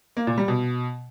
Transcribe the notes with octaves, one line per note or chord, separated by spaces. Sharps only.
A#3
A#2
G3
B2